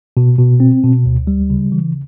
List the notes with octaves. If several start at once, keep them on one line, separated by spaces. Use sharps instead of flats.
B2
B2
C4
B2
D2
G3
C#3
E3